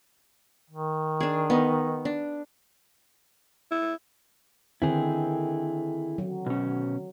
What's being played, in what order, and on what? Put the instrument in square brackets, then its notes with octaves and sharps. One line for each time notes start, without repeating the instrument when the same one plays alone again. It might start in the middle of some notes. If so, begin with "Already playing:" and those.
[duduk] D#3
[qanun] D4 G#4
B3 D#4
D4
[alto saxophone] E4
[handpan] D3 D#3 C4 [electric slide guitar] E4 G#4
[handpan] F#3
[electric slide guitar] B2 C#4